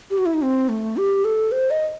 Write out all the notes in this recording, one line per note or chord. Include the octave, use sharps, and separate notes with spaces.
G4
F#4
E4
D#4
C4
A3
G4
A4
C5
D#5